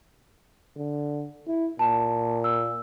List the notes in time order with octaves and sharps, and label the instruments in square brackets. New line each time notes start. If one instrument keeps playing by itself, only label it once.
[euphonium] D3
E4
[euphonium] A#2 [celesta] A5
[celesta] E6